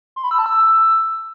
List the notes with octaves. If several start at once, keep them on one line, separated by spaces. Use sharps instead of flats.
C6
B5
E6
A5
E6